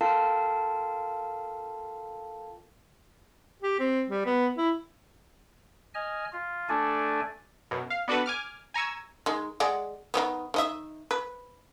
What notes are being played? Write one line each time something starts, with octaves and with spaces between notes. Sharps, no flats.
F4 A4 A#4 F5 G5 A5
G4
C4
G3
B3
E4
D#5 G#5 F6
F4
A3 D4 A4 D5 G#5
F#2 B2
F5
B3 D4 F#4 A4 B4
G#5 D6 F6
G#5 A#5 C#6 E6 G#6
D#3 G#3
G#3 D5 F#5
D#3 G3 B3
D#3 D#5 E5
B4